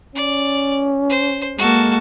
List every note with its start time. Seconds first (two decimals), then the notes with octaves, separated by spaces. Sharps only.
0.16 C#4 D5
1.10 C5
1.58 G#3 A#3 F#4 A4